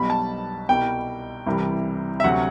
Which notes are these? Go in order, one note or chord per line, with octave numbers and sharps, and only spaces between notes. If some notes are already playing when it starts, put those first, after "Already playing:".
Already playing: B1 B2 G3 B5
A5
C2 B2 G3 G5
C2 C3 E3 G3
E5
D2 C3 F#3 F#5